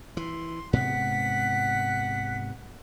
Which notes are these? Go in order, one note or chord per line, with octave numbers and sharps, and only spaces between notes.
E3 C6
G#2 C3 B3 F#5 B6